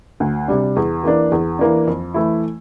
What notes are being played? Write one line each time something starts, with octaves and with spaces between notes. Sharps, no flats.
D2
C3 G3 D4
E2
E3 A#3 D4
E2
E3 A#3 D4
F2
E3 A3 E4